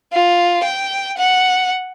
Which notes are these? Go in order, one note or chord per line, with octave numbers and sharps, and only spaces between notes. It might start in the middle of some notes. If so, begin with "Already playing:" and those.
F4
G5
F#5